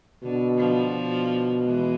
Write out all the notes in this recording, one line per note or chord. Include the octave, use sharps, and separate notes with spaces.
B2 D3
D3 F3
B2
E3 G#3